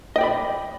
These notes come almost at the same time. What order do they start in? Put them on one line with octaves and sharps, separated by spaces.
D#5 G5 D5 B5